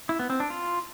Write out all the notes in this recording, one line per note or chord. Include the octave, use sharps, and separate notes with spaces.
E4
B3
C4
D4
F4